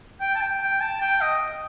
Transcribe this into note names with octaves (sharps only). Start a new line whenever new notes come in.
G5
A5
G5
G5
A5
G5
D#5